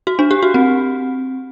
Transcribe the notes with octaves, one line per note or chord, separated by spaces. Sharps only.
F#4
D4
G4
F#4
C4